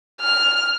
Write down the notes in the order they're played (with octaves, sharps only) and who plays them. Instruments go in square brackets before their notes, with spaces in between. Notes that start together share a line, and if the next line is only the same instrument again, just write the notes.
[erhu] F6